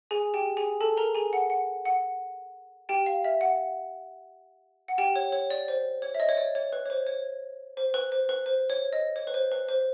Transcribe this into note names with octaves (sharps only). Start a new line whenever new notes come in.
G#4 G#5
G4 G5
G#4 G#5
A4 A5
A#4 A#5
G#4 G#5
F#5
F#5
F#5
G4 G5
F5
E5
F#5
F#5
G4 G5
C#5
C#5
D5
C5
C#5
E5
D#5
C#5
D5
C#5
B4
C#5
C5
C#5
C5
B4
C5
B4
C5
C#5
D#5
C#5
B4
C5
B4
C5